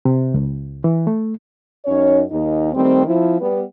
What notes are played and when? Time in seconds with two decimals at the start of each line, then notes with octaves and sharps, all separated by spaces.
0.05 C3
0.34 C#2
0.84 E3
1.07 A3
1.86 F#2 C#4 D#4 C#5
2.31 D#2 D#4
2.74 D#3 G3 A3 C4
3.06 F3 C4 E4
3.40 G3 B3